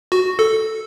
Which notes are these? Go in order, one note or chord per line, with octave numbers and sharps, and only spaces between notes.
F#4
A4